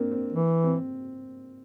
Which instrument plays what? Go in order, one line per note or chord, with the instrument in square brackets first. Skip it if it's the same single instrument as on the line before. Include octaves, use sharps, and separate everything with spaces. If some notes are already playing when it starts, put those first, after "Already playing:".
Already playing: [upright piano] A#3 C4 D4
C4
[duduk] E3
[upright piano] C4